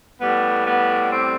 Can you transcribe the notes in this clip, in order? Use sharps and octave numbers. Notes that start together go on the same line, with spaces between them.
A2 G3 B3
B3
C4